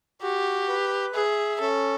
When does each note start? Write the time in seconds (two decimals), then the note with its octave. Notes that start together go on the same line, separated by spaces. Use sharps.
0.22 F#4 G4
0.68 B4
1.14 G#4 E5
1.60 C#4 A4